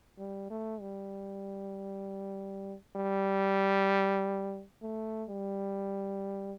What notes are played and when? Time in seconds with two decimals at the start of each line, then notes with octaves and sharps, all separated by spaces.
0.18 G3
0.50 A3
0.80 G3
2.96 G3
4.82 A3
5.29 G3